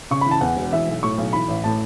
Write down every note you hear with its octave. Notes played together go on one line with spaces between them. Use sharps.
C#3 C#6
E3 B5
A5
E2 F#5
E1
E3 E5
B1
A2 C#6
B1
E3 B5
A1
A2 A5